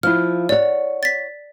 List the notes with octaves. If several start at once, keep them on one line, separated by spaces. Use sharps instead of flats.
F3 E4 F6
C#5 D5 F#5
A6 B6